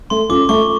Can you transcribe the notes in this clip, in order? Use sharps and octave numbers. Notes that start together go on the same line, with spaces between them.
A3 C6
C#4 F4 A4 D6
A3 C#6